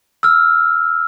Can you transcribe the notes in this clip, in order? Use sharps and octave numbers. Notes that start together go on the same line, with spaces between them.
E6 F6